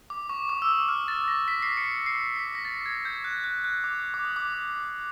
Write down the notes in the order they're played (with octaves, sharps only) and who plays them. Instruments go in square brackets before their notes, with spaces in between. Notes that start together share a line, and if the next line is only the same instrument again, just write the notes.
[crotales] D6
C#6
D6
E6
D#6
F6
A6
A#6
B6
C7
C#7
C#7
C7
B6
A#6
A6
G#6
G6
F#6
F#6
F#6
D6
D6
D#6
D6